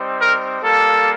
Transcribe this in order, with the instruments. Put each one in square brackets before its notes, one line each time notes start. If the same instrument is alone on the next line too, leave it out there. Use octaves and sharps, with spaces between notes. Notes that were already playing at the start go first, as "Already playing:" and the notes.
Already playing: [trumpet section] G3 C4 D#4
A#4
G3 A#3 F4 A4